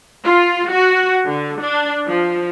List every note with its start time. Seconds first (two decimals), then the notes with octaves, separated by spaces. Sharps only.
0.24 F4
0.70 F#4
1.26 D3
1.61 D4
2.07 F3